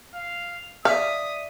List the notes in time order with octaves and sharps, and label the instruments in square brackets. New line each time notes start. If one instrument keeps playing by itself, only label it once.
[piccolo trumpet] F5
[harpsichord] D5 E5 [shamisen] F5 [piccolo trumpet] D#6